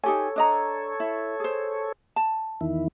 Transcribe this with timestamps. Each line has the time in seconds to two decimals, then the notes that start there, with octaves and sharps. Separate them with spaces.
0.04 D#4 G4 A4 C#5 G#5
0.36 D4 D#5 A#5
1.00 E4
1.40 G#4 C5
2.16 A5
2.61 E2 D#3 E4